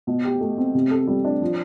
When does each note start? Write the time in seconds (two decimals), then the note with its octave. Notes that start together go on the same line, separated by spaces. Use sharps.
0.07 B2
0.24 G4
0.41 A3
0.58 C4
0.75 C3
0.91 A4
1.08 G3
1.25 D4
1.42 F3